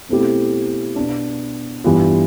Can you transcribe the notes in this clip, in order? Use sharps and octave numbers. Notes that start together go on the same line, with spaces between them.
B2 A3 C4 E4 G4
B2 B3 D4
G2 E3 G3 B3 F4